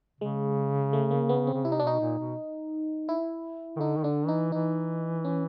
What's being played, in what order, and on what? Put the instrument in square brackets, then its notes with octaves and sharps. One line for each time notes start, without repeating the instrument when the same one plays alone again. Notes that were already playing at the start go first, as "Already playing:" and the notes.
[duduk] C#3 [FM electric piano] G#3
[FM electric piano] A3
A#3
B3
C4
[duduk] C#3
[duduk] C3 [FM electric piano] E4
[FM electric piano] D#4
D4
[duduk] B2 [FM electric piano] D#4
[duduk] A#2
B2
[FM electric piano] E4
[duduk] D#3
[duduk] D3 [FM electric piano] D#4
[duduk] D#3
[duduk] D3 [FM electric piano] D4
[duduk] E3 [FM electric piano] D#4
[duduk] E3 [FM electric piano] D#4
[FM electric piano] C#4